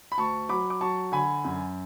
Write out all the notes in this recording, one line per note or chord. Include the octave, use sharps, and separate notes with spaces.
B5
D2 A5 C#6
F#3 B5 D6
D6
F#3 A5 C#6
D3 G#5 B5
F#2